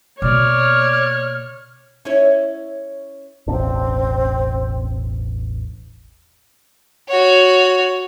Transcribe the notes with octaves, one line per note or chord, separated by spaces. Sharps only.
B2 A#3 C#5 D5 F6
C#4 E4 C#5
E1 A1 C4 D4
F#4 C#5